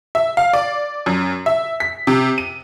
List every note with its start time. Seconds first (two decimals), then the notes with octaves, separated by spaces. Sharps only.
0.15 E5
0.37 F5
0.53 D5
1.06 F#2
1.46 E5
1.80 B6
2.07 C3
2.38 D#7